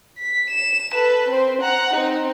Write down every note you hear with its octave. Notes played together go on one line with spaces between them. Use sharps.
B6
E7
A4 B4
C4 C5
F#5 A#5
C4 D#4